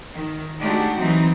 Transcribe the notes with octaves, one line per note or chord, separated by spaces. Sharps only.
D#3
G#3 A3 D4 D#4 F#4 G4
E3 F#3 C4 D#4